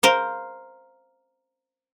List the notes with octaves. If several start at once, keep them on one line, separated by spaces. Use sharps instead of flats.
A#4 C5 F5